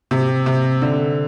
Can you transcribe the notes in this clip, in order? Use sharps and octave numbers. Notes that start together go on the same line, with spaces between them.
C3
C3
D3